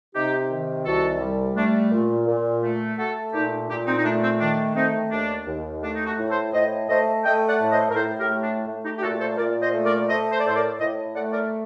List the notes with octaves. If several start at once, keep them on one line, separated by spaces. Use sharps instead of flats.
C3 D#4 G4
D#3
C2 F#4 A4
G3
A3 D4
A#2
A#2
A3
A3 F#4 A4
A#2 D#4 G4
A#2 D#4 G4
C4 D#4
D#4
A3 D4
C4
D#3 D4
A3 C4 D#4
D#2 D4
D#2
A3 D4
D#4
D4 F#4
A2
A4 C5
A2 C5 D#5
A3 C5 D#5
A3 D#5 G5
D5 F#5
A2
C5 D#5
A#4
A2 A4 C5
G4 A#4
A3
D4
A3
D#4 G4
G4
A#2 F#4 A4
A4 C5
A#2 A#4 D5
C5 D#5
A3
A#4 D5
A3 C5 D#5
C5
D5
A2 A4 C5
A#4 D5
A2 C5 D#5
A3 D5 F#5
A#4 D5